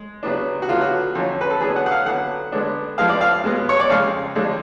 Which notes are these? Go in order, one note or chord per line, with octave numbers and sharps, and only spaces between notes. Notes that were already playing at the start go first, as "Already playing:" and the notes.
Already playing: G#3
C#3 F#3 B3 D4
F#4
D3 F#3 B3 F4
F#4
F2 D3 F#3 C#4
B4
A4
D3 F#3 B3 D4 G#4
F#5
F#5
F5
D3 F#3 B3 F#5
D3 G#3 B3 D4
F2 F3 G#3 B3 F5
D5
F5
B2 G#3 B3
C#5
D5
F2 C#3 G#3 F5
F2 D3 G#3 D4